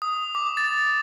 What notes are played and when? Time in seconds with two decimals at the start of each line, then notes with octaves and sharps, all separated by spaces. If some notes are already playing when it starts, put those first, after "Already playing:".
0.02 D#6
0.35 D6
0.57 A6